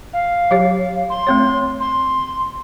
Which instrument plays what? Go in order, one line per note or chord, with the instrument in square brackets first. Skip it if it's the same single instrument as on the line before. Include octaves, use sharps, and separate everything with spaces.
[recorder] F5
[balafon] F#3 G4 C#5
[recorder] C6
[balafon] A3 C4 C#5
[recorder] C6